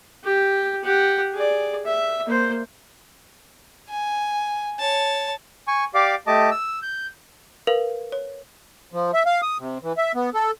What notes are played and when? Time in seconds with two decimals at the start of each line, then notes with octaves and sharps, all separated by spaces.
0.24 G4
0.84 G4 F#5
1.34 G#4 D5
1.85 E5
2.27 A#3 C5
3.90 G#5
4.79 C#5 A5
5.68 G#5 C#6
5.94 G4 D5 F5 D6
6.27 A3 G4 D#5 A5 D6
6.51 E6
6.82 G6
7.67 A#4 B4 F5
8.12 C#5
8.93 F3
9.14 E5
9.26 F5
9.42 D#6
9.59 C3
9.83 E3
9.98 E5
10.15 B3
10.34 A4